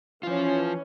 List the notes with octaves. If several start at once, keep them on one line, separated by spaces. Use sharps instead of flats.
E3 F3 C#4 F4